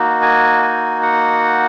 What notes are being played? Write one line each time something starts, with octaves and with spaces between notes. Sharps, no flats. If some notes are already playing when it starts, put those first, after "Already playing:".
Already playing: A#3 D#4 F#4
G#5
G#5
F#5